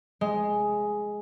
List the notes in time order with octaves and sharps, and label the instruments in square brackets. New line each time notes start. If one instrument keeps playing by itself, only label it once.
[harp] G#3